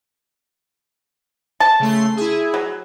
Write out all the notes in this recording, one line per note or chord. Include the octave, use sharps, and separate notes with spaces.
A5
C#3 A3 C6
E4 G#4
F#3